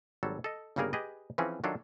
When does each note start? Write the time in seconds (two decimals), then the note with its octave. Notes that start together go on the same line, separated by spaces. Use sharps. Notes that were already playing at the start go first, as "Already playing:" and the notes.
0.23 G#1 F#3 G3 A4
0.44 A4 D#5
0.76 G1 C#3 G3 A#3 G#4 A#4
0.93 G4 G#4 B4 D#5
1.38 E3 F3 C4 C#4 G#4
1.64 D#3 F#3 D4 F4 A4